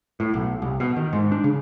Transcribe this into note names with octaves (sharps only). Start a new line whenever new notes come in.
A2
B1
C2
B2
D#3
G#2
D4
C#3